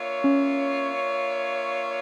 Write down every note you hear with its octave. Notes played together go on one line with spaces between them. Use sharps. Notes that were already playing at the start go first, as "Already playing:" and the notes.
Already playing: A#3 D4 F4 C#5 E5
C#4